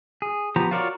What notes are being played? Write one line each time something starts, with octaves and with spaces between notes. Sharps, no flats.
G#4
F3 B3 G4 A#5
F4 F#4 A#4 C#5 D5